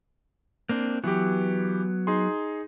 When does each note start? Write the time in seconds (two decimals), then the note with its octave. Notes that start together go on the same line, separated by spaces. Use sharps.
0.69 A#3 C4 D4
1.04 E3 F#3 B3 G4
2.07 D#4 G#4 C6